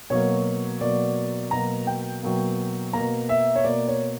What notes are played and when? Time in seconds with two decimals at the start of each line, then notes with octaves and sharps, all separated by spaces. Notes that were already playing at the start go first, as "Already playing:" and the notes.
0.10 B2 F#3 A#3 C#5
0.81 B2 F#3 A#3 D5
1.51 B2 F#3 A#3 A#5
1.87 G5
2.23 B2 F#3 A#3
2.93 B2 A#3 A#5
3.29 E5
3.55 C#5
3.64 B2 A#3 D5
3.88 C#5